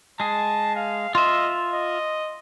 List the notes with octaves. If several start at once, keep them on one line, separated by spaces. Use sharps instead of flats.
G#3 G#4 A5
F5
F4 D#5 E5 C6
D#5